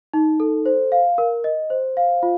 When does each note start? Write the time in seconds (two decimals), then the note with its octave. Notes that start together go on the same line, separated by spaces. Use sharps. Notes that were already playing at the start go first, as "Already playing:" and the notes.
0.14 D#4
0.40 A4
0.66 C5
0.92 F5
1.18 A#4
1.44 D#5
1.70 C5
1.97 F5
2.23 F4